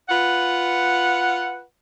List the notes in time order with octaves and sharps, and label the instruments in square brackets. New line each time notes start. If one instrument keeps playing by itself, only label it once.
[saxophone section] F4 B4 F#5